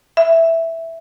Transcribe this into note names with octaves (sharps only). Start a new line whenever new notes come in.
E5